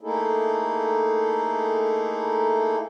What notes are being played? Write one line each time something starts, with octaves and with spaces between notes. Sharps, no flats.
A3 A#3 D#4 E4 G#4 A4